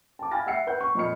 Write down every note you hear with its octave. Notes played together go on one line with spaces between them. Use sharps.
A5 D6
F5 G#5 B5 F6 A6 A#6
E5 F#5 E6 C7 C#7
B4 F#5 F#6 G6
C#6
F2 A#2 D#5 B5 F6 C#7